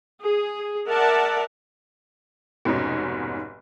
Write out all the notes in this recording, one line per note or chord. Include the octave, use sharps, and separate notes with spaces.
G#4
A#4 D5 E5 F#5 A5
F1 G#2 B2 C#4 D#4